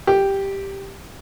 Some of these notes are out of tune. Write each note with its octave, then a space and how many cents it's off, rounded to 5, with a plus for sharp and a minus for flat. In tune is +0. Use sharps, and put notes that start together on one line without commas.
G4 +0